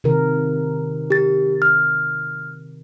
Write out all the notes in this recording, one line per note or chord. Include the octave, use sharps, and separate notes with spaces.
C3 D#3 A#4
G4 A6
F6